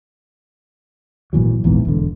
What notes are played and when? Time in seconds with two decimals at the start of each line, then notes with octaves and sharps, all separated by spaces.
1.33 G#1 A#2 E3 F#3
1.64 A#1 E2 G#2 E3
1.85 E1 D3